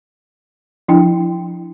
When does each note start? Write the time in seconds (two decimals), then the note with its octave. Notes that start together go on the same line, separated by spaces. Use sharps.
0.88 F3 D4 E4 G5